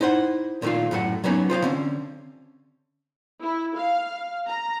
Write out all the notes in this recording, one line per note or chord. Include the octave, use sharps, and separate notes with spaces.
D#4 E4 C5 F#5
A#2 D#3 A3 D#4 F4
F#2 A2 A3 A4 F#5
F#3 A#3 B3 C#4 D#4
F4 C5 D#5 F5
D3 C4 C#4
E4
F5
A#5